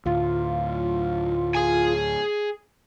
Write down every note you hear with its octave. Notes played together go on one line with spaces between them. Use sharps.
D2 A2 F4
G#4 G#5